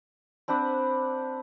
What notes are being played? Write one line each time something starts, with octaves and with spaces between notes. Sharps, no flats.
C4 D4 B4 F#5